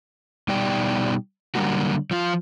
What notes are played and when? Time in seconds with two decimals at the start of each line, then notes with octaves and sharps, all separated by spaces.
0.48 B2 G3 D#4 D5 G5
1.55 D3 F#3 G3 A#3 F#4
2.11 F3 F4